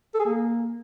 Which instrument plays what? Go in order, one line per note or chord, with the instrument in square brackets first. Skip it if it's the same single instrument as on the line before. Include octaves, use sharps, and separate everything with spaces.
[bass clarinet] A4
G#4
A#3